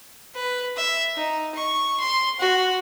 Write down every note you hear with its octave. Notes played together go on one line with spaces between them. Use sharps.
B4
E5
D#4
C#6
C6
F#4